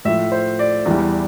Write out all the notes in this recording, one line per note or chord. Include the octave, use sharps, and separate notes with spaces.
A2 F3 E5
C5
D5
E2 E3 G3